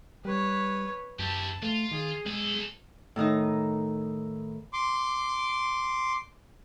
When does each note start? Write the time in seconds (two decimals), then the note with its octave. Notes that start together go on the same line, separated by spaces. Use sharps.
0.25 G3 B4 C#5
1.19 F#2 E4 G4 A5
1.63 A3 F4
1.91 D#3 G#4
2.26 B1 G#3 A4
3.16 A2 D#3 D#4 D#5
4.73 C6 D6